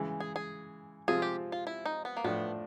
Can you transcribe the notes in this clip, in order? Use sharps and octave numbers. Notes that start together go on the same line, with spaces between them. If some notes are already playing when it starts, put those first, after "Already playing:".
Already playing: C#3 E3 G#3
G#4
G#4
C3 F3 G#3 C4 F4 G#4
G4
F4
E4
D#4
B3
A#3
A2 F3 A3 B3 D4